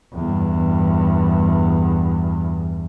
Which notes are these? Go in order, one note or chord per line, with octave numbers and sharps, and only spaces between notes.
E2 G2